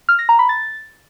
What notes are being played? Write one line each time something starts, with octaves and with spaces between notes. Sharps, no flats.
F6
A#6
A#5
B5
A6